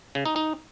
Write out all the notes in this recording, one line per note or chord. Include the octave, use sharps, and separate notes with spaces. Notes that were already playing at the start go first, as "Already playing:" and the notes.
C#3
D#4
D#4